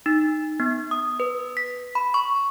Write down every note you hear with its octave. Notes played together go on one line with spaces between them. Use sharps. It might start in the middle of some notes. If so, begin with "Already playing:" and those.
D#4
B3
D#6
B4
B6
B5
C#6